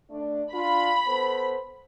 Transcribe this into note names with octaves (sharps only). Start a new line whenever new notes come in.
A3 D4
D4 F4 B5
B3 A4 C5